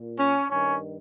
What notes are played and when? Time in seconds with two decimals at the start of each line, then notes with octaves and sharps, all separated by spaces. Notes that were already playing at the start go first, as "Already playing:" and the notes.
Already playing: A#2
0.19 C#4
0.50 G2 D#3 C#4